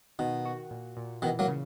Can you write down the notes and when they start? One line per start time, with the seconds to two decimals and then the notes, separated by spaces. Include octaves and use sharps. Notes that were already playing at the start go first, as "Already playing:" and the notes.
0.19 B2 D#3
0.45 F#4
0.71 A#2
0.97 A#2
1.22 B2 D#3 E3
1.39 F#3 A#3
1.48 C#3